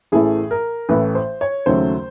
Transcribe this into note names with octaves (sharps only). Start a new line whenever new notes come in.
A1 A2 E3 A3 G#4
A#4
A1 A2 E3 A3 B4
C5
C#5
D#2 C#3 F#3 A3 C5